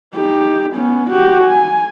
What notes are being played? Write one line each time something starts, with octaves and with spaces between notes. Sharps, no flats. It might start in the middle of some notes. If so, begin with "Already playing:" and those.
D#4 G4
B3 C#4
F#4 G4
G#5